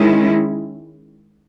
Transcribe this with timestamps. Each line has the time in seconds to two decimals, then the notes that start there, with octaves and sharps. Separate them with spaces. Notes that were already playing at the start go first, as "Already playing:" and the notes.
Already playing: D#3 G#3 C#4 E4